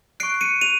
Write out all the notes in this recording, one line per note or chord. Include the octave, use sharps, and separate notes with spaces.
C#6 F#6 C7 D7
C#7 D#7
D#7 F7